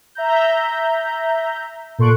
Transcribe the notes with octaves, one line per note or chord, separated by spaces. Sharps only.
E5 A#5 G6
A#2 A4 C6 C#6 F#6 D7